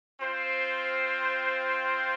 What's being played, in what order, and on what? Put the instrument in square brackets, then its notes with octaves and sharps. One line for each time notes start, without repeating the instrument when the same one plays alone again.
[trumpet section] C4 F4 C5